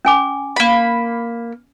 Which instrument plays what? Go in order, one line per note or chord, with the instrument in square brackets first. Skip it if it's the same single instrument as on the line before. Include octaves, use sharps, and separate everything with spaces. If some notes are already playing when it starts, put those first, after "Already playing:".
[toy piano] C#4 G#5 D6
[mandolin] A#3 B5